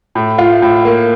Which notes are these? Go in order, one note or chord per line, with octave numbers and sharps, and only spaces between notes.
A2
F4
A2
A#3